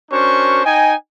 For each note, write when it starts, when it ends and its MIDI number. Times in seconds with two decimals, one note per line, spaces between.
0.12 0.64 61
0.12 0.64 62
0.12 0.64 66
0.12 0.64 70
0.12 0.64 72
0.12 0.64 85
0.65 0.94 63
0.65 0.94 75
0.65 0.94 79
0.65 0.94 80